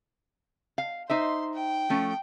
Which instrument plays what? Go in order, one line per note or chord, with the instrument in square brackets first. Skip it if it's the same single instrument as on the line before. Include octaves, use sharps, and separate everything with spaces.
[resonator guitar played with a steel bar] F5
[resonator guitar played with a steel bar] D#4 C5 E5 [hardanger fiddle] C6
[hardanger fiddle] G5
[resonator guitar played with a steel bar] F3 A3 C#4